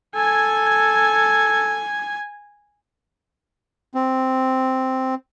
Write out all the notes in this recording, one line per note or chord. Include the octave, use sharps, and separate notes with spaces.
A4 G#5 G#6
C4